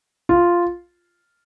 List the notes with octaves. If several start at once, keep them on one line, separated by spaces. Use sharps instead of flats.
F4